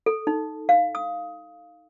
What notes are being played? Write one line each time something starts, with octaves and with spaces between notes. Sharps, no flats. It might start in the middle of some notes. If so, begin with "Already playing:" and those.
A4
D#4
F5
D#6